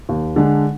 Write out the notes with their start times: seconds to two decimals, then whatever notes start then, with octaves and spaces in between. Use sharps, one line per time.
0.09 D#2
0.36 D3 G#3 D4